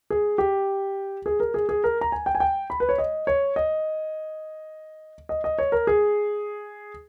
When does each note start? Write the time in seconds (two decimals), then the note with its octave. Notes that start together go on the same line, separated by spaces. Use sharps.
0.10 G#4
0.38 G4
1.26 G#4
1.40 A#4
1.54 G#4
1.69 G#4
1.84 A#4
2.01 A#5
2.12 G#5
2.26 G5
2.35 G#5
2.40 G5
2.70 B5
2.80 B4
2.89 C#5
2.98 D#5
3.27 C#5
3.56 D#5
5.29 D#5
5.44 D#5
5.59 C#5
5.72 A#4
5.87 G#4